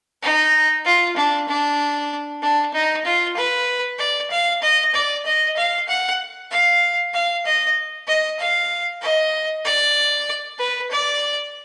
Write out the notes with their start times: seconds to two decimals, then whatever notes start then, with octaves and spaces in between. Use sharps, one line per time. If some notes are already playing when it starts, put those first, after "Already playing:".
0.22 D#4
0.85 F4
1.16 D4
1.48 D4
2.42 D4
2.74 D#4
3.05 F4
3.37 B4
3.99 D5
4.30 F5
4.62 D#5
4.94 D5
5.25 D#5
5.56 F5
5.88 F#5
6.51 F5
7.14 F5
7.45 D#5
8.07 D#5
8.39 F5
9.02 D#5
9.65 D5
10.59 B4
10.90 D5